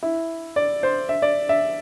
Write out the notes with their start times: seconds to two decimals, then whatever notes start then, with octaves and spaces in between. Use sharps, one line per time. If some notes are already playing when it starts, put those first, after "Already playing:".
0.03 E4
0.56 D5
0.83 C5
1.09 E5
1.22 D5
1.49 E5